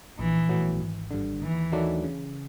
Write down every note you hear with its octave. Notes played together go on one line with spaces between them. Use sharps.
A#1 E3
A2 F#3 B3
G#1
G2 D3
D#2 E3
D#3 F#3 A3 D4
C#3